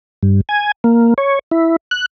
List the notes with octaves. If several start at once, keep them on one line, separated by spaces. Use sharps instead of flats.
G2
G#5
A#3
C#5
E4
F#6